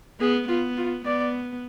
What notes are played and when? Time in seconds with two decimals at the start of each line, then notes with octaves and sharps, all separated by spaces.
0.20 B3 G#4
0.48 B3 F4
0.77 F4
1.05 B3 D5